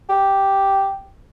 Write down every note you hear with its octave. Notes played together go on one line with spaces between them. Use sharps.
G4